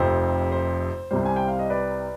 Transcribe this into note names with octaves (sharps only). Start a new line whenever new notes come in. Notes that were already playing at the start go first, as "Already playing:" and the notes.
Already playing: F1 F2 C3 C5
C5
C2 C3 G3 C5
G#5
G5
F5
D#5
B4 D5